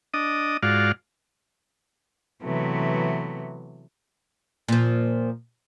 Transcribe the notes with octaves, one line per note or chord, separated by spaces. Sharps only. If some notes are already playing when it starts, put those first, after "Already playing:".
D4 D#5 D#6
G#2 F4 F#4 D5 F5
C3 E3 F#3 A3 B3
A#2 F3